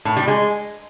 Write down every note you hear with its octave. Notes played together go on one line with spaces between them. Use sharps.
A2
G3
G#3